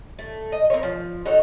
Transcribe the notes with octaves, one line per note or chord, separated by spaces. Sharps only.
A3
D#5
C4 A#4 C#5
F3
D#4 F#4 A4 C#5